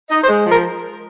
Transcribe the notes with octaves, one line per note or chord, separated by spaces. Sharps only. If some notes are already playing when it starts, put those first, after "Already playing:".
D#4 D#5
C5
G#3
F3
A#4